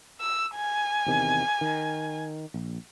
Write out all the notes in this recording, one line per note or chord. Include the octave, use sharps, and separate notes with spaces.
E6
G#5
E2 C3 D#3
D#3
A#1